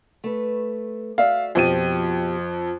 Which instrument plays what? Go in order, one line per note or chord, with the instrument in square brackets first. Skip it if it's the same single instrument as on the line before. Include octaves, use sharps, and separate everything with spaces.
[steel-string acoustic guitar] A3 B4
[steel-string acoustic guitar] F#4 D5 E5 [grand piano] F5
[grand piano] F2 F3 D#7 [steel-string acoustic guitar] B2 G4